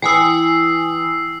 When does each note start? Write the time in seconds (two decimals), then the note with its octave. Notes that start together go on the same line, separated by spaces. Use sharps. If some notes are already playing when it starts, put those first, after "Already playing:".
0.02 E3 G5 G#5 D#6 E6 C7